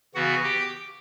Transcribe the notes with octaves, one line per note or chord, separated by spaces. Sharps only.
C#3 E3 B3 F#4 F#5
G4 G5